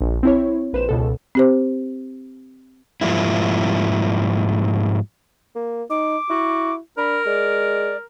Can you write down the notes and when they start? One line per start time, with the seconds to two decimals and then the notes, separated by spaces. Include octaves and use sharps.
0.01 A#1
0.23 C4 E4 C#5
0.73 A#1 B4 C5 E7
0.89 C#2 B2 A4
1.35 C4 G4 C5
3.01 G#2 F3 G3 A#3 E4
5.55 A#3
5.90 D#4 D6
6.30 E4 F#4
6.97 D4 A#4 B5
7.26 G#3 D5